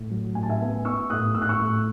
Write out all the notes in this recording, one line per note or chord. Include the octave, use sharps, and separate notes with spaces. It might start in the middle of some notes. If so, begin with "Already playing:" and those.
Already playing: A2
F#3
A2 G#5
A5
E5 G#5
B3
B3 C#6 E6
A2 D#6 F#6
A2 E6
F#6
C#6 E6
A2